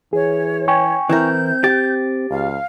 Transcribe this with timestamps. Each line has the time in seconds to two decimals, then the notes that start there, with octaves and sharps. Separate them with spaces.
0.13 E3 G#4 C#5
0.68 G5 G#5 C#6
1.10 E3 C4 E4 A#4 G6
1.64 G4 A6
2.30 C#2 F5